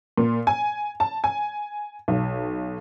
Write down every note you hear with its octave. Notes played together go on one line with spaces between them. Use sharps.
A#2
G#5
A5
G#5
B1